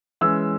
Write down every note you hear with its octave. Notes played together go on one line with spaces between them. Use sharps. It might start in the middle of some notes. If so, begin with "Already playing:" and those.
E3 G#3 C#4 E6